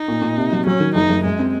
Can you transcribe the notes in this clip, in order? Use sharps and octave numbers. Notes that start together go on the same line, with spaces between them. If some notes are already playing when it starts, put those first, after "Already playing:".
Already playing: D#4
A#2
A#2
C3
F#3
F#3 C#4
D#3
F#1 D#4
F#1
F#2 G#3
C4